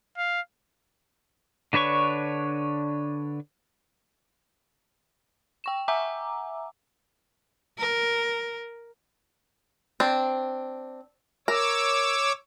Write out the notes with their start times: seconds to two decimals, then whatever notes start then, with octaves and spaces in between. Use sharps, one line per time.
0.17 F5
1.73 D3 D4 B4 C#5 C#6
5.64 G5 C#6 E7
5.88 E5 F#5 G#5 A#5 D6 E6
7.78 A#4
10.00 C4 D4
11.48 A#4 C#5 D6 E6